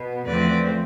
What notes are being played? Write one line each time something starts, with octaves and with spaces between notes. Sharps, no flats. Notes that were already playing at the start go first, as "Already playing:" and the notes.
Already playing: B2 B3
E2 D3 F3 A3 C4 B4 D5